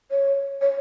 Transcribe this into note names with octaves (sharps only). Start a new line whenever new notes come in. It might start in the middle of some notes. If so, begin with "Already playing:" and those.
C#5
C#5